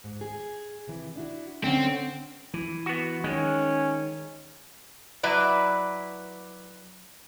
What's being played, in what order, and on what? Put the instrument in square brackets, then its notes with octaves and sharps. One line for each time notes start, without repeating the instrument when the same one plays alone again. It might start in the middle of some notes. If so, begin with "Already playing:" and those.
[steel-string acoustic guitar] G#2
G#4
C3 E3
D4 E4 F#4
[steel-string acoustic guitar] D3 C#4 F#5 [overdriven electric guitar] C4
[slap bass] E3
[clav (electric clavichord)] B3 F#4
[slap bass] D#3 [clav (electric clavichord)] G#3 [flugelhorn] C#4
[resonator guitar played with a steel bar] F#3 E4 B4 D5